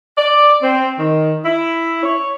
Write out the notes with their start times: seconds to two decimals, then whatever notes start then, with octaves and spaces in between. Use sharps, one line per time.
0.17 D5
0.61 C4
0.97 D#3
1.45 E4
2.03 C#5